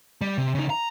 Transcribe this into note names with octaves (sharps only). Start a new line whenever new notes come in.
G3
C3
C#3 D#4
A#5